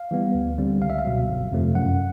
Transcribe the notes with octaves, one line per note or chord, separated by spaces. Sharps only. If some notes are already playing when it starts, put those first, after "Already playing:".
Already playing: F5
E3 G3 B3
D2
D3 G3 C4
C#2 F5
E5
F5
B2 F#3
G1
F2 C3 F3 A3
F#2 F#5